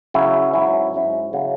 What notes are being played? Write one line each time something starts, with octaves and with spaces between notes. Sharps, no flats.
C#3 F#3 C#4 E4
G#2 F#3 C#4 E4
G#2 F#3 C#4 E4
C#3 F#3 C#4 E4